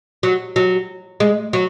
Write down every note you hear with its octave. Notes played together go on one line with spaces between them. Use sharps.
F#3
F#3
G#3
F#3